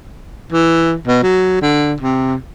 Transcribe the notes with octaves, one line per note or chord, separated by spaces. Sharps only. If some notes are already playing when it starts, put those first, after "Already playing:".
E3
B2
F#3
D3
C3